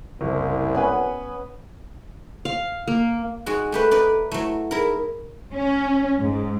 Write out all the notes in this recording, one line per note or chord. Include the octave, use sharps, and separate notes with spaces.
F#1 C2
B3 C#4 B4 G#5
F5
A#3
G#3 D#4 F#4 G#4
A3 G4 A4 B4
D#4 B4 D5
F#3 A3 E4
D#4 E4 G#4 A#4
C#4
G#2